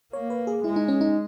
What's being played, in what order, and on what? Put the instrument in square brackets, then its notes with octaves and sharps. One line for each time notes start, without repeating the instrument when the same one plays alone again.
[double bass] A#3 [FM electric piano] C#5
[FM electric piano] B4
G#4
[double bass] G#3 [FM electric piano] E4
[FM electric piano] D#4
C#4
D#4